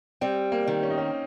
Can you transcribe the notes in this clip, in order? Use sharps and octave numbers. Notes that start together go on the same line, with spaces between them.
G3 C4
A#3
D#3
C#4
D#4
C#4